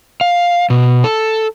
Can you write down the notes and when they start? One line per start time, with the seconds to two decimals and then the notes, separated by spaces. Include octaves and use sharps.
0.21 F5
0.70 B2
1.04 A4